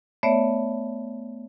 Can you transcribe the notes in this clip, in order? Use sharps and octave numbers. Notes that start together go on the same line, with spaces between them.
A3 B3 C#5 D5 E5